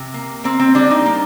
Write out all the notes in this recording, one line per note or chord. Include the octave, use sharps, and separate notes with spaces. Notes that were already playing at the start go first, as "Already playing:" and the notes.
Already playing: C3
A#3
A#3 C4
C4
G3 D4
D#4
A#3